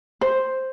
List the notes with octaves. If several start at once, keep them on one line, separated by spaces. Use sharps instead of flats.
C5